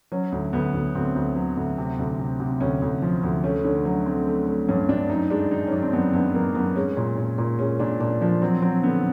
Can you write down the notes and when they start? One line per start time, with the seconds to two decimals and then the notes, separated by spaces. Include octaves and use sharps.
0.12 F#3 C#4
0.32 D2
0.53 D2 B3
0.74 D2
0.95 D2 C4
1.15 D2
1.36 F#3
1.57 D2
1.78 C3
1.99 D2
2.19 C3
2.40 C3
2.60 D2 C#4
2.82 D2
3.02 F3
3.23 D2
3.44 A3 C#4
3.65 D3 C#4
3.85 F#3 C#4
4.06 A3 C4
4.27 A3
4.47 A3
4.69 G2 C#4
4.89 G2 D4
5.10 F#2 D#4
5.30 G#3 D4
5.51 D#3 D#4
5.67 C#4
5.72 F#2 D4
5.83 C4
5.93 F#2 B3
6.13 F#2 B3
6.34 F#2 A#3
6.55 F#2 B3
6.76 G#3 C#4
6.97 A#2
7.18 A#2
7.38 A#2
7.59 G#3 C#4
7.80 A#2 D4
8.00 A#2 D4
8.21 F3 D4
8.42 F#3 C4
8.62 F#3 C4
8.83 D3 B3